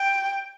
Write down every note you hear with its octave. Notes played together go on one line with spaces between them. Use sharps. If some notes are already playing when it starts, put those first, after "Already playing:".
Already playing: G5